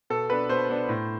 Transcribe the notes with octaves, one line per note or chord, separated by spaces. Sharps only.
B2 A4
B3 D4 B4
B2 C5
B3 D4
A2